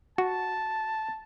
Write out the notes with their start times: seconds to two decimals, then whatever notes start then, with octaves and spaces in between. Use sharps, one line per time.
0.18 F#4 A5